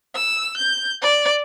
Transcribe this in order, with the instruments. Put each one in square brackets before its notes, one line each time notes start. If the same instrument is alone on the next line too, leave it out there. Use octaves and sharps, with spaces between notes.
[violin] E6
G6
D5